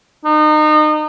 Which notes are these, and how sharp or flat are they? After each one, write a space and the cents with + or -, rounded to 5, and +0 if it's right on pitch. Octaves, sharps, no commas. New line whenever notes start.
D#4 -30